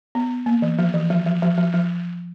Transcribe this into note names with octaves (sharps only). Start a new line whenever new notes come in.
B3
A#3
E3
F3
E3
F3
F3
F3
F3
F3